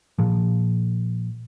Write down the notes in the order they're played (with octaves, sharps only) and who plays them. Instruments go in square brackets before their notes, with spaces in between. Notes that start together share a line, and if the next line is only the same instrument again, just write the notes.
[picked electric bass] A#2 F3